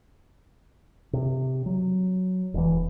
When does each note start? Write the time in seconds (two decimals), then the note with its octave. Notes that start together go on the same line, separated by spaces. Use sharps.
1.13 C3
1.66 F#3
2.54 E1 E3